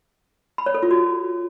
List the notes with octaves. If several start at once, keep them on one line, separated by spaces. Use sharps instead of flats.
B5
C#5
A4
F4
F#4